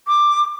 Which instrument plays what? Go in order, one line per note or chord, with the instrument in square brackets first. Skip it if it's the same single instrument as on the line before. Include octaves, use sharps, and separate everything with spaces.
[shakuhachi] D6